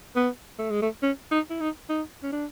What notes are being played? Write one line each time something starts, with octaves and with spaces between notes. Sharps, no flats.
B3
A3
G#3
A3
C#4
D#4
E4
D#4
D#4
C#4
D4